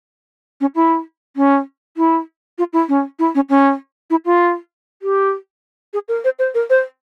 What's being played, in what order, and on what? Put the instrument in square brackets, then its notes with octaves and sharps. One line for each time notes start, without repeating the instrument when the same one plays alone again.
[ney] C#4
E4
C#4
E4
F4
E4
C#4
E4
C#4
C#4
E4
F4
G4
G#4
A#4
C5
C5
A#4
C5